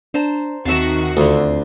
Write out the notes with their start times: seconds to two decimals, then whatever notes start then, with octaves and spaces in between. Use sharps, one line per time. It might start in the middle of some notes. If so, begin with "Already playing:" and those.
0.14 D4 C5 A5 A#5
0.65 D#2 D#3 C4 F#4 E5 A5 C7
1.17 D2 D3 F4